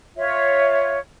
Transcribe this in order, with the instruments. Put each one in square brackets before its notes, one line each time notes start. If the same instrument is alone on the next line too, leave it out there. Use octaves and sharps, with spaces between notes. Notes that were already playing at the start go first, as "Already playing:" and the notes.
[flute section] F4 C#5 E5